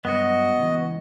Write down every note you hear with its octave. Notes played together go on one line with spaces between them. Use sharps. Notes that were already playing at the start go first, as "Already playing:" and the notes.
G2 F#3 B3 F#4 D#5
C#2 E3